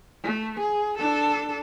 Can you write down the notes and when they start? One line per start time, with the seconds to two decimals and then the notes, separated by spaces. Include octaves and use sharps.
0.23 A3
0.59 G#4
0.98 D4 A4